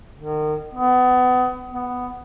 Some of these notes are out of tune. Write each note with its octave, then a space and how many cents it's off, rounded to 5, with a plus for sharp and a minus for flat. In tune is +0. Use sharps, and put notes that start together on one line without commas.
D#3 -35
B3 +30
B3 +5